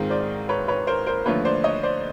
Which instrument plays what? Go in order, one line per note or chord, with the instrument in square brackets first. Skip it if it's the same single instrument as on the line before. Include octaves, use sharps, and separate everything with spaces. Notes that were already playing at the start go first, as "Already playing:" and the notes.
Already playing: [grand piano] G#2 D#3 G#3 C4 F4 [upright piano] A#4
[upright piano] C5 D5
B4 C#5
B4 C#5
A#4 C5
A#4 C5
[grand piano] D#2 D3 F3 A3 [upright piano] B4 C#5
[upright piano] C5 D5
C#5 D#5
C5 D5